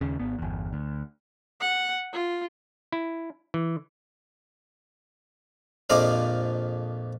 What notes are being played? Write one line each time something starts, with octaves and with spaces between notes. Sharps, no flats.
D#2 C#3
G#1 B3
G1 E2
D2
F#5
F4
E4
E3
A#1 F2 F4 D5 D#5 F5